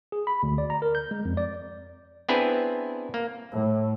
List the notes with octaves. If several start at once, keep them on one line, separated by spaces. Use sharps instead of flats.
G#4
B5
D2
D5
A#5
A#4
G6
G#3
F2
D5
B3 C4 D4 E4 G#4 B4
A#3
A2